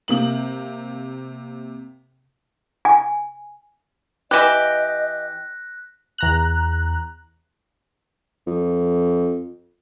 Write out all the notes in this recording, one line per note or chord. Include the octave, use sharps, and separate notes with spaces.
C3 A#3 F#7
G#5
E3 G4 D#5 F#6 A#6 B6
E2 A#5 F#6
F2